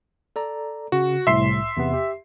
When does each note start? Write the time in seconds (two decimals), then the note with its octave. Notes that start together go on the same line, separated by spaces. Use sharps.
0.36 A4 D5 A#5
0.92 C#3 F#4
1.27 C2 A2 E5 C6 C7
1.77 E2 C3 B3
1.93 G4